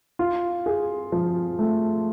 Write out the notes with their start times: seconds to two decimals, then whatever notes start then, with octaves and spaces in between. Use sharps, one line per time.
0.19 F4
0.66 G#4
1.12 F3
1.59 A3